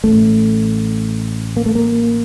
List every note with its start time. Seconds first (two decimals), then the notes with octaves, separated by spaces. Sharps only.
0.04 A1 A2 A3
1.57 A#3
1.66 A3
1.75 A#3